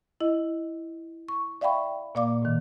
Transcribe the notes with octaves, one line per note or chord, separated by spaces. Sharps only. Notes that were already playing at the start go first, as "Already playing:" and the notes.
E4 D#5
C#6
D5 E5 F5 G5 B5 C#6
A#2 A#3 D5 F5 D6
A2 D#3